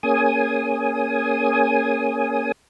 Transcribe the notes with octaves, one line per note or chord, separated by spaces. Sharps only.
A#3 C#4 G#4 G#5 D#6